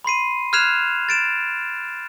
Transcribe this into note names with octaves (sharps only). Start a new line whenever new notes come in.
B5 C6 C7 D#7
F6 F#6 G#6 C7 E7 F7
A6 D7 E7